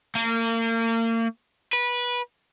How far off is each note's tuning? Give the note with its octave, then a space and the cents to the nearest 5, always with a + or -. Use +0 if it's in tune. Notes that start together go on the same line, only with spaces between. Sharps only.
A#3 -35
B4 -20